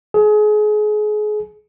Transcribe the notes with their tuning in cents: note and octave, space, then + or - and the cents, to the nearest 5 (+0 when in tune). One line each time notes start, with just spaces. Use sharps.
G#4 +30